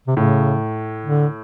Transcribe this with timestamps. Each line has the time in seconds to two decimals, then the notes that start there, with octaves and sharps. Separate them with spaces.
0.08 C3
0.17 A2 C#3
1.06 D3